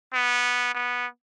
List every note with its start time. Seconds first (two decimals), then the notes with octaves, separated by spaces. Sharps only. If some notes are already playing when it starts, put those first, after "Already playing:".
0.13 B3
0.74 B3